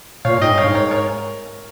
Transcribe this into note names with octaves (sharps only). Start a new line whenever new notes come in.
A#2 C#5 F5
G#2 D#5 G5
G2
C#5 F5
G#2
A#4 C#5
A#4 C#5